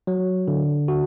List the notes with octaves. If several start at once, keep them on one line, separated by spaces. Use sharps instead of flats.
F#3
D3
F#4